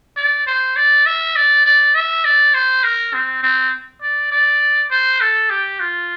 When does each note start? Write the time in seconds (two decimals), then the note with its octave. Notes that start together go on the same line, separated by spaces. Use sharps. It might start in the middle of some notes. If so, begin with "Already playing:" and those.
0.17 D5
0.47 C5
0.76 D5
1.06 E5
1.36 D5
1.66 D5
1.95 E5
2.25 D5
2.54 C5
2.84 A#4
3.13 C4
3.43 C4
4.02 D5
4.32 D5
4.91 C5
5.21 A4
5.50 G4
5.80 F4